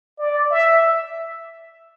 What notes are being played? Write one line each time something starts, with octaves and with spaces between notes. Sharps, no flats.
D5
E5